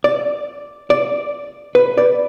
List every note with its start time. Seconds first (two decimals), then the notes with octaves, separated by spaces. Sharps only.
0.04 D5
0.90 D5
1.75 B4
1.97 D5